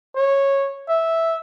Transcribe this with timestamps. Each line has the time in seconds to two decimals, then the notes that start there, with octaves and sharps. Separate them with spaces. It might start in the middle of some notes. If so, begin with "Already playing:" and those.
0.16 C#5
0.89 E5